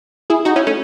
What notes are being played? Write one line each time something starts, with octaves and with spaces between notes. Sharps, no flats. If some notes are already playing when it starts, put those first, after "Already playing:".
E4 G#4
D#4 F#4
C#4 E4
A3 C#4